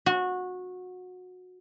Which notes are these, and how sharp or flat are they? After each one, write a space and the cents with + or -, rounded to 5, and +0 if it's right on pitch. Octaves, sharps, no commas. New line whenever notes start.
F#4 -20